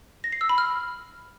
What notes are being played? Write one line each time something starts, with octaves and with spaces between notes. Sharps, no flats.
A#6
C7
E6
B5
F6